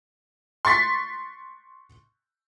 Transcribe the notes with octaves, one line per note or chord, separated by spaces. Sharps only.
C6 C#6 A6 B6